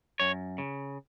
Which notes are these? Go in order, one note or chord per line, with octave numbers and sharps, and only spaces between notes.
F#2 C#5
C#3